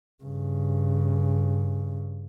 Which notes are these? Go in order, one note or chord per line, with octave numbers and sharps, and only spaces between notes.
G2 C#3